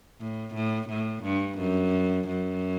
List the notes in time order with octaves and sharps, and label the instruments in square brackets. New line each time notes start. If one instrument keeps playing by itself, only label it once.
[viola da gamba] A2
A2
A2
G2
F#2
F#2